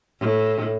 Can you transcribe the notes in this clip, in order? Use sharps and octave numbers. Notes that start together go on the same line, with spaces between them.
A2